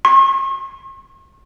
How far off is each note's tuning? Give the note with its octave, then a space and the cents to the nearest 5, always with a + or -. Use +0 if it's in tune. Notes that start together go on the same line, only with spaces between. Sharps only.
C#6 -45